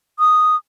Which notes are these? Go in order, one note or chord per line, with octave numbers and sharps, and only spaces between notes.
D#6